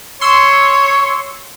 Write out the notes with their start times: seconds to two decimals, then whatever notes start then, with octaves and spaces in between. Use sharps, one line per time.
0.21 C#5 C6 E6